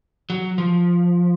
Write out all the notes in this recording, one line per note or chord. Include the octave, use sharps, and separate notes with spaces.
F#3
F3